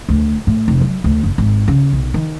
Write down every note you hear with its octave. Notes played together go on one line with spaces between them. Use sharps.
D2
A2
F1
F#3
D2
F#1
G#1
C#3
B1
D#3